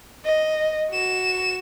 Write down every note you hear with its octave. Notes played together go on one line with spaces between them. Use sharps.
D#5
F#4 E7